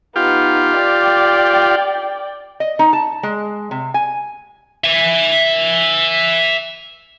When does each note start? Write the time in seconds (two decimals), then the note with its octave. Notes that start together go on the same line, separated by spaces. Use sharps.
0.16 B3 D#4 F4 G4
0.76 D5 G5
2.60 D#5
2.79 D#4
2.93 A5
3.23 G#3
3.71 C3
3.94 G#5
4.84 E5 G#5